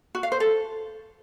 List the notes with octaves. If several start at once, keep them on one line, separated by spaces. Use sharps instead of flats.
F#4
F5
C5
A4